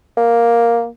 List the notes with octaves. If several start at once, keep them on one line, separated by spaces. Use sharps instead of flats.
A#3